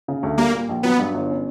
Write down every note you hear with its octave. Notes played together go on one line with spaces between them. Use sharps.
C#3
D2
G3 A#3
A#2
A#1
F#3 B3
G2
G1
C#4